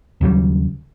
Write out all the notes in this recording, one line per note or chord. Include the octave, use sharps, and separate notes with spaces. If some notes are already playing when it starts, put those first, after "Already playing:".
D#2 C#3 F#3 G3